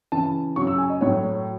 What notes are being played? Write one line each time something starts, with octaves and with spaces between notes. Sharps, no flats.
C#3 E3 A5
C#3 F#3 C#6
E6
G#5
D#5
A2 F#3 C#5
C#5